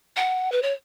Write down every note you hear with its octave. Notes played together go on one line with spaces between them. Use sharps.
F#5
B4
C#5